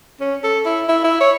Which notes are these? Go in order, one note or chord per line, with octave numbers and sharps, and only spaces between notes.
C#4
A4
E4
E4
E4
C#5